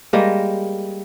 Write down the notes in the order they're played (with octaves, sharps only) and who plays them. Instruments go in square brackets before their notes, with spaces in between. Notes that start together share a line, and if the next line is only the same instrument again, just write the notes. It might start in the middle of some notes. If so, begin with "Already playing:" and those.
[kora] G3 G#3 A#3